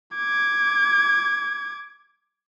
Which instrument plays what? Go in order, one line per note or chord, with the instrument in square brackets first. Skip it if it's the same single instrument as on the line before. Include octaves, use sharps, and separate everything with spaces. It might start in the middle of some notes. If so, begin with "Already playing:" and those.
[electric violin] D6 G#6